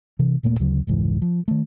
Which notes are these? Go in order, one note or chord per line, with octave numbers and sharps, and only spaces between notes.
C3 E3
D#1 A#2 A3 A#3
D2 C#3 F#3
F1 C#2 G#2 E3
F3
D#3 A3